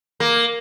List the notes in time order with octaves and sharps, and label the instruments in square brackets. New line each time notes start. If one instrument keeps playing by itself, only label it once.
[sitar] A#3